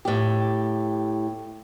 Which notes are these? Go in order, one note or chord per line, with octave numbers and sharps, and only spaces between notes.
A2 G4